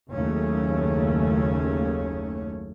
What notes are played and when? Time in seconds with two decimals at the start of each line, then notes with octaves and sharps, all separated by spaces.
0.10 F#1 D#2 C#3 A3 C#4